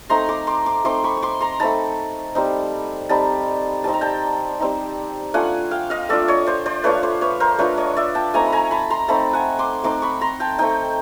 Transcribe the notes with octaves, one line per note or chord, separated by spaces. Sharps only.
A3 C4 D#4 A#5 C6
C6 D6
C6 D6
C6 D6
A3 C4 D#4 C6 D6
B5 C#6
C#6
C6 D6
A#5 C6
A3 C4 D#4 A5 B5
G3 C4 D#4
G3 C4 D#4 A5 B5
G3 C4 D#4 A5
A#5
G5 A5
G3 C4 D#4
A3 D4 F4 F#5 G#5
F5 G5
D#5 F5
A3 D4 F4 D5 E5
C#5 D#5
C5 D5
C5 D5
A3 D4 F4 B4 C#5
C5 D5
B4 C#5
A#4 C5
A3 D4 F4 B4 C#5
C#5 D#5
D5 E5
G5 A5
A3 C4 D#4 G#5 A#5
B5
G#5 A#5
A5 B5
A#5 C6
A3 C4 D#4 A5 B5
F#5 G#5
C6 D6
A3 C4 D#4 C6 D6
B5 C#6
A#5 C6
G5 A5
A3 C4 D#4 G5 A5